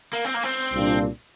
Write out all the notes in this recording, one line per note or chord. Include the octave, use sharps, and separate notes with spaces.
A#3
C4
A#3
C4
C2 A#2 G3 D4 F4